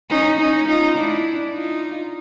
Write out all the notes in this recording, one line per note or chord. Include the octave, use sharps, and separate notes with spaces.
C#4 D#4
C#4 D#4
D#4 F4
D4 E4
D#4 F4